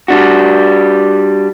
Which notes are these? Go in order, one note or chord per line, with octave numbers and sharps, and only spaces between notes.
G3 D4 F#4